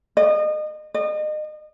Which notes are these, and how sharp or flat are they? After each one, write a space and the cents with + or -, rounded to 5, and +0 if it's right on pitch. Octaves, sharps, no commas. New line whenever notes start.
D#5 -30
D#5 -35